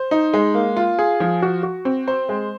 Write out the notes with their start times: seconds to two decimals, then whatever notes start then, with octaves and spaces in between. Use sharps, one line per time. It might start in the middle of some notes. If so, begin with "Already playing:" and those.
Already playing: C5
0.11 D#4
0.33 G#3
0.54 A#3
0.76 F4
0.99 G#4
1.20 F3
1.42 F#4
1.63 F#4
1.85 C4
2.08 C5
2.29 G#3